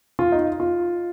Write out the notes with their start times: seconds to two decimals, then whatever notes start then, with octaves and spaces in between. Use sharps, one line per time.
0.19 F4
0.32 D#4
0.60 F4